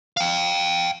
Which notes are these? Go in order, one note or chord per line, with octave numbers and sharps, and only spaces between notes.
F5 G5